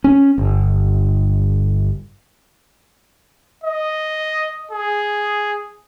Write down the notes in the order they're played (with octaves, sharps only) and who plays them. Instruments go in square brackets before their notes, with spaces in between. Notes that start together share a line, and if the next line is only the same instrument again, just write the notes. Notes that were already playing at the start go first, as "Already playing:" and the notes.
[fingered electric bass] C#4
G1
[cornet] D#5
G#4